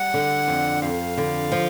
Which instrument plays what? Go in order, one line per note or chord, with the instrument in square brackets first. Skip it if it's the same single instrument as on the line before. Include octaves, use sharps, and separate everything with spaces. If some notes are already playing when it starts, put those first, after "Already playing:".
Already playing: [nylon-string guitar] G3 [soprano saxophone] F#5
[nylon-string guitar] D3
F2
[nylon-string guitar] F2 [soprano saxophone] F5
[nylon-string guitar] D3
F3